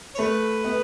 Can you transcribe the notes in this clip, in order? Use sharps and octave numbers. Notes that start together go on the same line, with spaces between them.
C#5
A3 B4
B3